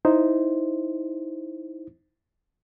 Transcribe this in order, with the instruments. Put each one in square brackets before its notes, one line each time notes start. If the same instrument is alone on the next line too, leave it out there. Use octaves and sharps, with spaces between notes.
[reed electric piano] D#4 E4 C5